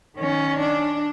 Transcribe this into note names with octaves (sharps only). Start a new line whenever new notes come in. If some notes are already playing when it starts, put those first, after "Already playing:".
D#3 C#4
D4